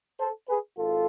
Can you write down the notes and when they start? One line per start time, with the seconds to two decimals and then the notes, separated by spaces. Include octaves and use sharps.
0.20 A4 C5
0.49 G#4 B4
0.78 G#1 F4 A4